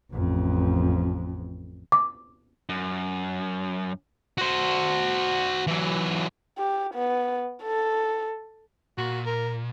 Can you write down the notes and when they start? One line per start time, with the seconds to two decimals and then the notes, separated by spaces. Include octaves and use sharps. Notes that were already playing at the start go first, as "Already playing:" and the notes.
0.13 A1 F2
1.92 D6
2.69 F#2
4.38 F#4 C5
5.67 E3 F#3
6.59 G4
6.94 B3
7.63 A4
8.98 A#2 F#4
9.26 A#4